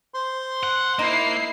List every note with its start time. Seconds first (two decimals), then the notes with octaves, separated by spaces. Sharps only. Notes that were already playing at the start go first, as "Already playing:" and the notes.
0.14 C5 C6
0.63 F#5
0.99 A#3 D#4 E4 C7